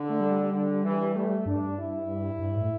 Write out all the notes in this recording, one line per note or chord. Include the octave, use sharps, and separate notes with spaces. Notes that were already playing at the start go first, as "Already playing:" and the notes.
Already playing: D3
A3
G3
D3
E3
A3
G2 D4
E4
G2
A2